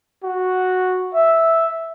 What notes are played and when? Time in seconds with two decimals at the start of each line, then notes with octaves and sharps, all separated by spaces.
0.24 F#4
1.14 E5